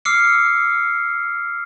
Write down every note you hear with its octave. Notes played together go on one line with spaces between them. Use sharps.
D6 E6 F6 C7 C#7